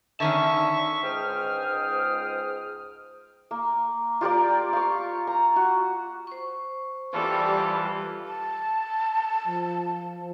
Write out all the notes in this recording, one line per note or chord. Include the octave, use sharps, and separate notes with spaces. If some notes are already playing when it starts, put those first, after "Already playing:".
D3 D#3 C#4 E5 A5 C#6
C#2 G#2 C5 G5 D#6 F6
A#3
F4 G4 A#4 D5
F5 C#6
A#5
F#4
C5 C#6
E3 G3 F4 A4
A5
F3